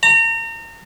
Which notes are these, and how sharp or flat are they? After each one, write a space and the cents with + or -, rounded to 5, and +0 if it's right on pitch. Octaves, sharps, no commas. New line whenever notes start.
A#5 -35